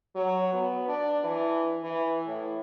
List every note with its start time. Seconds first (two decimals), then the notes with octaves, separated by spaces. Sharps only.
0.15 F#3
0.53 B3
0.88 D4
1.24 E3
1.83 E3
2.26 A2